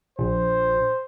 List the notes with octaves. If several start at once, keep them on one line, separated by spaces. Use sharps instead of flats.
A#1 C5